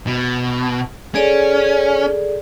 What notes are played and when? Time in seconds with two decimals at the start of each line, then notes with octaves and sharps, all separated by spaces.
0.07 B2
1.15 C#4 G#4 A4 D5